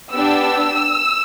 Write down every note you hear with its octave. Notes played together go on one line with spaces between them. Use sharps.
B3 D4 G4 E6